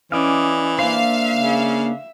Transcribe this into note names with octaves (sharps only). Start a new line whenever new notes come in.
E3 C#4 D5 D#5 F5
A#3 D4 C5 E5 F5
C#3